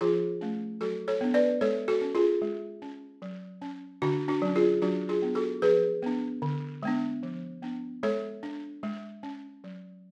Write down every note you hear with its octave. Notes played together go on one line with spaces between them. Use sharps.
F3 F4 G#4
A3 C#4
F#3 F#4 A4
A4 C#5
B3 D4
B4 D5
G#3 A4 C#5
F#4 A4
C#4
F4 G#4
G#3
C#4
F#3
C#4
D3 D4 F#4
D4 F#4
F#3 C#4
F4 G#4
F#3 D4 F#4
F4 G#4
B3 D4
F#4 A4
F3 G#4 B4
B3 D4
D3
G#3 B3 D4
F3
B3 D4
G#3 A4 C#5
D4
G#3
C#4
F#3